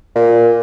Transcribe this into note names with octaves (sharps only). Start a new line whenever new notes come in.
A#2